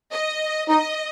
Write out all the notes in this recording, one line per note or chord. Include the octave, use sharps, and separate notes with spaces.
D#5
D#4 D#5